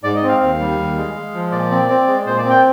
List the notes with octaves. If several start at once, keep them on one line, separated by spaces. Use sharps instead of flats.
G#2 D5
D#5
C4
F5
D#2 F5
G3
D#2
G#3
G#3
F3
A#2 D5
C4
C4
G#3
A#2 C5
D5
C4
G5